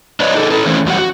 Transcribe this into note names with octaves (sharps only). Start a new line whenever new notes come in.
D4 B4 C#5 D#5
D#4 G#4 A4
E4 A4 B4
E3 A3 C4 C#4
E2 F#3 G3 G4 F#5
F#4